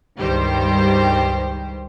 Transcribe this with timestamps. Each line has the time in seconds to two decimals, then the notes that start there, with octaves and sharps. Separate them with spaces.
0.17 C#2 G2 D#3 G3 G4 C5